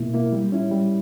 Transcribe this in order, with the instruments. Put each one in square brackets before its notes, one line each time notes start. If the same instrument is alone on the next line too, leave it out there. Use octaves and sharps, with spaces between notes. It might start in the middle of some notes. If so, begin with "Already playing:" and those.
Already playing: [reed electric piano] B2 A#3 E4
A#3 E4
G3
C#4 E4
G3